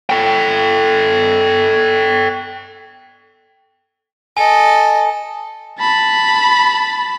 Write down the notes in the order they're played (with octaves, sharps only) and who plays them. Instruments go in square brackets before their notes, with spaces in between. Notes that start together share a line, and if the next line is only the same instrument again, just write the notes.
[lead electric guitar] A4 G5
[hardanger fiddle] A4 D#5 [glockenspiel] G#5
[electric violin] A5 B5